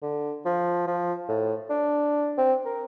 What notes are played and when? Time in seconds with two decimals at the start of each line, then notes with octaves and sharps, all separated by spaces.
0.02 D3
0.45 F3
0.87 F3
1.29 A2
1.70 D4
2.38 C4
2.65 A#4